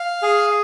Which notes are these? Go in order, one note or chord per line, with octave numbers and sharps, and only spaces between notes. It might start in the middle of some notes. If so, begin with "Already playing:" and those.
Already playing: F5
G#4